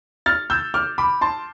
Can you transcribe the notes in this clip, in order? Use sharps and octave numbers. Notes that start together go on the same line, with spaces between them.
F6 A6
E6 G6
D6 F6
B5 D6
A5 C6